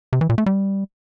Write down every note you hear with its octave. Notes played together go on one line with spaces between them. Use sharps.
C3
E3
A#2
A3
G3